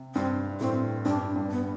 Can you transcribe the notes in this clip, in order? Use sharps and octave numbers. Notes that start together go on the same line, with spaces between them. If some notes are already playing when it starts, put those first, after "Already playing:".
Already playing: C3
G2 C4
A2 C4
G2 D4
G2
B3